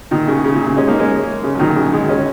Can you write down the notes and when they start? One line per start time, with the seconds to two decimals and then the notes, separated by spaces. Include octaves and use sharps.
0.11 A#2 D#3
0.27 C#3
0.44 C#3
0.55 A#2
0.66 C#3
0.76 G#3 C#4
0.87 A#3 D#4
0.99 G#3 C#4
1.43 C#3
1.55 F#3
1.59 A#2 D#3
1.75 C#3 F#3
1.93 D#3 G#3
2.09 G#3 C#4